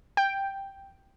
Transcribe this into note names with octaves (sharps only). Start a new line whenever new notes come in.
G5